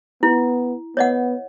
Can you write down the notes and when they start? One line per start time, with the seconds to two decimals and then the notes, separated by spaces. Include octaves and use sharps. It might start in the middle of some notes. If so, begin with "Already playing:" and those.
0.23 B3 E4
0.97 B3 C#5 D#5 F#5